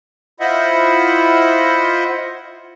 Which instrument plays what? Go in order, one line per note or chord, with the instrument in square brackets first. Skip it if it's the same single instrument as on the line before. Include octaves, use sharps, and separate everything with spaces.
[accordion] E4 F4 C5 D#5 E5 F#5